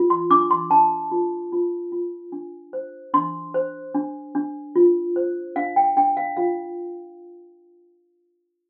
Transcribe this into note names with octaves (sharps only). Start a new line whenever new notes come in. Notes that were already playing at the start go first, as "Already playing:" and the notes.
Already playing: F4
C6
D4 D6
D6
C6
D4 A5
F4
F4
F4
D4
C5
D4 C6
C5
D4
D4
F4
C5
D4 F5
G5
D4 G5
F5
F4 F5